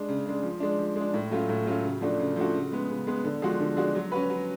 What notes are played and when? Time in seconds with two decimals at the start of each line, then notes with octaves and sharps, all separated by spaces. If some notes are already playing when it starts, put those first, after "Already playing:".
Already playing: G#3 D4
0.09 C#3
0.26 G#3 D4
0.43 F3
0.60 G#3 D4
0.78 F3
0.96 G#3
1.01 D4
1.14 A2
1.31 F#3 A3 C#4 F4
1.49 A2
1.66 F#3 A3 C#4 F4
1.84 C#3
2.01 F3 A3 D4 F#4
2.20 C#3
2.36 F3 A3 D4 F#4
2.54 C#3
2.72 G#3 B3
2.89 C#3
3.07 G#3 B3
3.25 D3
3.42 F3 G#3 D4 F#4
3.60 D3
3.77 F3 G#3 D4 F#4
3.95 F#3
4.12 C#4 F#4 B4
4.30 F#3